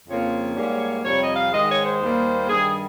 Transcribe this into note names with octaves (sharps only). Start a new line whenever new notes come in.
F2 C#3 F3 A#3 C#5
G#2 G3 A#3
F2 C3 G3 C#5
D#5
F5
G#2 D#3 G#3 D#5
C#5
C5
D#2 D#3 G3 A#3
G2 D#3 G3 G#4